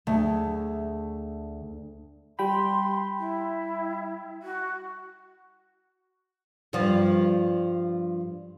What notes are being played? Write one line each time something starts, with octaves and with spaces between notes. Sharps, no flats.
D2 A3 G#4
G3 G5 B5 C6
E4
F#4
G2 F3